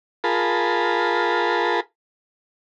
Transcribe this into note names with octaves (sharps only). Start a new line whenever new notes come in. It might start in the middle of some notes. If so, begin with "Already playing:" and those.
F4 G#4 A#4 A5 B5